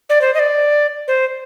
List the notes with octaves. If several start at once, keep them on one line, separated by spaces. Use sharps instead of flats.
D5
C5
D#5
D5
C5